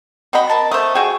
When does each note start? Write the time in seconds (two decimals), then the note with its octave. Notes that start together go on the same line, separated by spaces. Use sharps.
0.33 C4 F#4 D#5 B5
0.50 A#4 A5
0.72 A3 C5 E5 D#6
0.95 F#4 G#4 G5